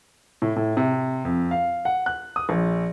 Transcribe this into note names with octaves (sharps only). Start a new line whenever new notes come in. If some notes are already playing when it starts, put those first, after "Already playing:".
A2
A2
C3
F2
F5
F#5
F#6
D#6
A#1